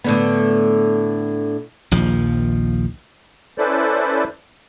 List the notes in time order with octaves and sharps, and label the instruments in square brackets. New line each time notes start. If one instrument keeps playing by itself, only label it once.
[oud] A2 D3 B3
[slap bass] A#1 D#2 F3
[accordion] C#4 E4 A4 B4 C5 D5